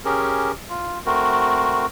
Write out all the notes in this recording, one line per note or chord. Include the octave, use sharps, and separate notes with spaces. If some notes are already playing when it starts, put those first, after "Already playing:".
C#4 G4 G#4 A#4
F4
A3 C4 F#4 A#4